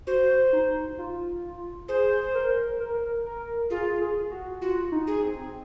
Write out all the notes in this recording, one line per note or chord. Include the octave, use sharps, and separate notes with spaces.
F#4 C5
D#4
F4
G#4 C5
A#4
A#4
A#4
F4 G#4
G#4
F#4
F4 F#4
D#4
G#4
C4